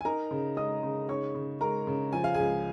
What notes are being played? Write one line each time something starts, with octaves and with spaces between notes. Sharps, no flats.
G#5
D#4 A#4 A#5
C#3
G#3 D#5 D#6
C#3
D#4 C#5 C#6
C#3
G#3 A#4 A#5
C#3
F3 G#5
F5
C#2 G#4 G#5